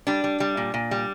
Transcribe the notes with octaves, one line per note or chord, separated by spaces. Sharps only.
G3 D4
G3
G3
A#2
A#2
G3